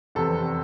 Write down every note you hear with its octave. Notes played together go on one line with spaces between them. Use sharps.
F1 E2 C3 A4